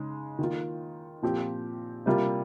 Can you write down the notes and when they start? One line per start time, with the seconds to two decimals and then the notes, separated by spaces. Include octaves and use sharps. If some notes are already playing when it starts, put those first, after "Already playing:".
Already playing: C#3 G#3 D#4
0.39 D#3 A#3 F4
1.22 A#2 F3 C4 G4
2.06 C3 G3 A#3 F4